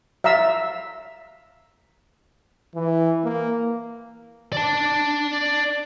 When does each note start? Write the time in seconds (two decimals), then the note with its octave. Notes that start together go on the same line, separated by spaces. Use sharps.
0.24 E5 F5 A#5 E6
2.75 E3
3.24 A#3
4.52 D5 A5